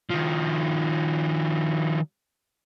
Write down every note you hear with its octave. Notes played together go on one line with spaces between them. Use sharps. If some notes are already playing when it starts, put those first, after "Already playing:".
D#3 F3